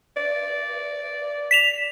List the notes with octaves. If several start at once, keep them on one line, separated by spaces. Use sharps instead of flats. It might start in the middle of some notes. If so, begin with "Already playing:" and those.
D5
B6 E7 F7